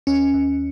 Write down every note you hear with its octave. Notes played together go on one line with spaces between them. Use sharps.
D#2 C#4
D#2